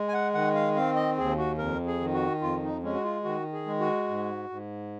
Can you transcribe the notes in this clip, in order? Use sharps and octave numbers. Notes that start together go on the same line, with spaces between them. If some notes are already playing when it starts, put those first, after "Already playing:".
Already playing: G#3
G#5
F#5
D#3 F#5
F5
C4 F5
D#5
D#2 G#4
F#4
F2 A#4
G#4
D#3
F#4
F2 F4
D#4
G#3 C#4
F#4
F4
D#3 F#4
G#4
G#3
F#4
G#2
G#2